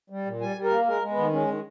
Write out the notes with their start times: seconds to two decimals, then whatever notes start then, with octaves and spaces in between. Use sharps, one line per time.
0.10 G3
0.26 A#2
0.41 G3 G#5
0.56 G3
0.64 A#4
0.71 A#3
0.86 G#3 A#4
1.02 G#3
1.10 B3
1.17 D#3
1.32 G#3 C#4
1.48 D#3